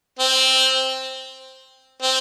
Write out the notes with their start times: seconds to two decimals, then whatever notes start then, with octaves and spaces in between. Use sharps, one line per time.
0.19 C4
2.02 C4